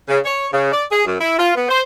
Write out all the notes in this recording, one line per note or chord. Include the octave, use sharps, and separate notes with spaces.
C#3
C#5
C#3
D5
G#4
F#2
E4
F4
B3
C5